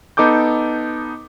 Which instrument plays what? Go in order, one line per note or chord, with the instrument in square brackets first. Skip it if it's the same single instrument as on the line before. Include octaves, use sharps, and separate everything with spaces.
[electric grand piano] B3 D#4 A4 D6 G6